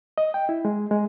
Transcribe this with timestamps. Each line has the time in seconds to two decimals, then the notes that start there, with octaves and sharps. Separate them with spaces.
0.18 D#5
0.34 G5
0.49 E4
0.65 G#3
0.91 G#3